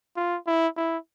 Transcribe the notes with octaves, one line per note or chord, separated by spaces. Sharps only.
F4
E4
E4